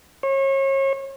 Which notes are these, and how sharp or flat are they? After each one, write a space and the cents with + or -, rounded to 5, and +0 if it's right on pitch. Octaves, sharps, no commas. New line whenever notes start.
C#5 -35